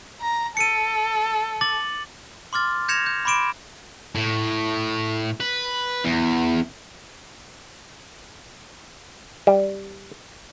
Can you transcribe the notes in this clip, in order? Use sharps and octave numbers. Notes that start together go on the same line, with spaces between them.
A#5
A4 C#7 D#7
D6 A6 F#7
C6 D6 F6 A6
G6 G#6 A#6 C#7 E7 F7
G6
B5 C6 D6 D7 E7
A2
B4
E2
G3